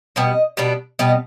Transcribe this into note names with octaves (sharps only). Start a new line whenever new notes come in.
B2 G3 B3 D#5
B2 G3 B3 D4
B2 G3 B3 D#5